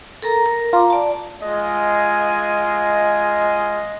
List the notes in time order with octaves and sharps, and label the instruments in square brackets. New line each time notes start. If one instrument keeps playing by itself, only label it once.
[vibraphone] A4 A#4 A#5
A#4
[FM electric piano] F4 [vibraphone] A#5 D6
[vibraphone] D5 A5
[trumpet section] G#3 F4 G#5 [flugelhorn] D#5